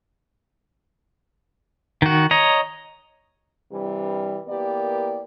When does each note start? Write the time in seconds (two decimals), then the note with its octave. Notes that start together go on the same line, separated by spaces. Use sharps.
2.02 D#3 F#4
2.31 C#5 D#5 A#5
3.72 G2 C3 E3 G3
4.48 E3 A#3 B3 G4 A#4 D5